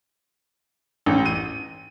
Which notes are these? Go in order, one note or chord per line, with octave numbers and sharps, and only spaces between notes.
A1
D#7